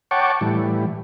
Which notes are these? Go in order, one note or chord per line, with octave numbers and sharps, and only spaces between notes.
C#5 F#5 G5 A5 C#6 D6
A2 E3 G3